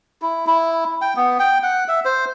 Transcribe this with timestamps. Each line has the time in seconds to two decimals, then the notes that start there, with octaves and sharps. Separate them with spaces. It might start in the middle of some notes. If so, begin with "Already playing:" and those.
0.22 E4
0.47 E4
1.02 G5
1.16 B3
1.39 G5
1.63 F#5
1.88 E5
2.05 C5